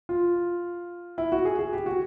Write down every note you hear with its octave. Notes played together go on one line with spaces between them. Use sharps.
F4
E4
F#4
G#4
G#4
G4
F#4